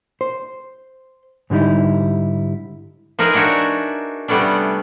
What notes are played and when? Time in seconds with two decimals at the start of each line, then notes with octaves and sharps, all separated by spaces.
0.21 C5
1.50 G#2 D3 G3 D#4 E4
3.19 F3 D#4 G#4 A#4 B4 E5
3.34 D4 D#4 F#4 C#5 E5
4.28 C3 G3 A3 B3 C#4 D4